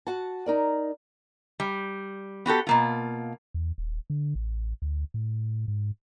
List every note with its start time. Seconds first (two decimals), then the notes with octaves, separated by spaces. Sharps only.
0.07 F#4 F#5 A5
0.46 D#4 A#4 D5
1.60 G3
2.46 B3 F#4 G4 A4
2.67 B2 A#3 F4
3.54 E2
3.78 D#1
4.10 D3
4.35 A1
4.82 D2
5.14 A2
5.68 G#2